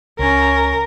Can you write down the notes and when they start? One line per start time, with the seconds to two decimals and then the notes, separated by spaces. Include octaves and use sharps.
0.19 C#2 C#4 A#4